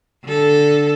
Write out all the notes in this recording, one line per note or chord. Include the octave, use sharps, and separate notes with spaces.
D3 A4